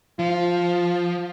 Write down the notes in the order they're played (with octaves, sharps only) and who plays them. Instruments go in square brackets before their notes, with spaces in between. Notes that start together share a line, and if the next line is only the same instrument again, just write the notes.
[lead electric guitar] F3 [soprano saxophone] F4